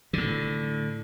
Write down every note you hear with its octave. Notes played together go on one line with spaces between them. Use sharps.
A2 D3